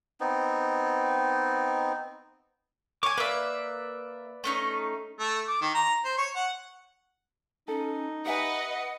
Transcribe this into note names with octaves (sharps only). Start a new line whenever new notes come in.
B3 C4 D#4
C#5 G#5 D6
A#3 B4 D5 E5
A3 C#4 D#4
A3
D6
D#3
A#5
C5
C#5
F#5
C#4 D#4 A4
G4 B4 D#5 E5 F#5 G#5